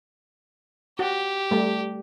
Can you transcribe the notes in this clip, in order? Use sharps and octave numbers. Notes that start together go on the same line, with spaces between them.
F#4 G4
G3 A3